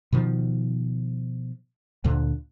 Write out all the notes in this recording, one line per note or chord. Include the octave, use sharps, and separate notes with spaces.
B2 D#3 F3
D2 A#2 D3